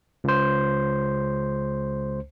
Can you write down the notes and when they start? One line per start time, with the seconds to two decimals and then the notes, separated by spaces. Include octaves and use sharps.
0.24 C#2 C5